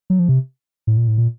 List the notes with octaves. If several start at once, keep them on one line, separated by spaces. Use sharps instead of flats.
F#3
F3
C3
A2
A#2
A2
A#2